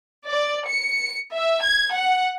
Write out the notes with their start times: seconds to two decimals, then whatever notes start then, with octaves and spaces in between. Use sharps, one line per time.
0.28 D5
0.67 C#7
1.34 E5
1.64 G#6
1.95 F#5